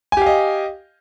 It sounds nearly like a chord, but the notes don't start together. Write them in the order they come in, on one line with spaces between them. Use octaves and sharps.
G#5 G4 F5 D#5